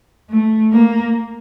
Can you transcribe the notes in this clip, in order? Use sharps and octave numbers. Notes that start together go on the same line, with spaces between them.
A3
A#3